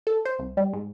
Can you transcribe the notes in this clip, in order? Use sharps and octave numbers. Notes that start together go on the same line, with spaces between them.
A4
C5
C2
G3
G#2